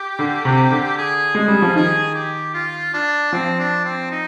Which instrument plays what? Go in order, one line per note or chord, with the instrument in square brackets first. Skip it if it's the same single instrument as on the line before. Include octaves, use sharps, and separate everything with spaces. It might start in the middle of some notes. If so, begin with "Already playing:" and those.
Already playing: [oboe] G4
[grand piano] D3
C3
D3
[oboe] G#4
[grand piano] G#3 [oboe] G#4
[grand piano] G3
F3
[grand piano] D#3 [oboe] G#4
[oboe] G4
F4
D4
[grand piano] F3 [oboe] C4
[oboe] D4
C4
D#4